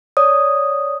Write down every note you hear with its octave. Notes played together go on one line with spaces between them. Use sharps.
C#5 D5 D#6